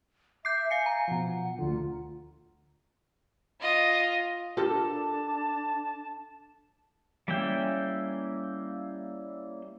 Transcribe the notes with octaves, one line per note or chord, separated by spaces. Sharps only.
E5 D6 G6 C7
F5 G#5 C7 C#7
A#5
B2 F3 F#5
D2 D3 F4
F4 D#5
D4 F4 G4 A4 A#4 A5
G3 A#3 C#4 E4 G5